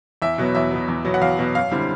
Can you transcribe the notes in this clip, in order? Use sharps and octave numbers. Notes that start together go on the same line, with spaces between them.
E2 E5
B2 F#3 B3
E2 E5
B2 F#3 B3
E2
B2 F#3 B3
F#5
E2 F5
B2 F#3 B3
F#2 F5
D3 G3 C4 E4